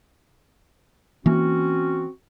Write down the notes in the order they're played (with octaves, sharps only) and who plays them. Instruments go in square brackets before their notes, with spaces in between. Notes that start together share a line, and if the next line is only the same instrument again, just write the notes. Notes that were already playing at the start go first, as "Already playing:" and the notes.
[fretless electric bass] E3 A#3 [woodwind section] C4 C#4 F#4